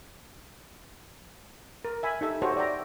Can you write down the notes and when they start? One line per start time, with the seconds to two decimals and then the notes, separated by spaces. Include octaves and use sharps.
1.85 A#4
2.03 E5 G#5 B5
2.21 D#4 G4 A4 E5
2.42 F#4 G4 A4 C5 C#5 D#5
2.57 D5 E5 G5 A#5